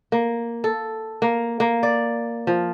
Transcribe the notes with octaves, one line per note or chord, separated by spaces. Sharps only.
A#3
A4
A#3
A#3
D5
F3